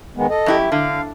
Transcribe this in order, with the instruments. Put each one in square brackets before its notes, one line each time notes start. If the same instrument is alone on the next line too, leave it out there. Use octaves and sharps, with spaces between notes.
[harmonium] D#3 G#3 B3
A4 D#5
[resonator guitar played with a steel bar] F#2 E4 G4
[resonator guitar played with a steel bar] D3 [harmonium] F5